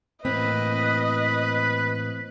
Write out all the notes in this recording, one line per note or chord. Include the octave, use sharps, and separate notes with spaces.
A2 E3 A#3 C4 B4 D#5